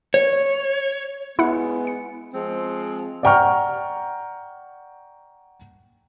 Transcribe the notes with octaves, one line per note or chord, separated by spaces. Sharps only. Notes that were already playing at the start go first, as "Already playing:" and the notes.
C#5
G#3 B3 E4 F#5
C#7
F3 G#3 C4
D5 F#5 G5 A#5 C#6 F6